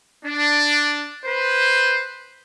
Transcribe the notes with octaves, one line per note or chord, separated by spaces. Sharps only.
D4
B4 C5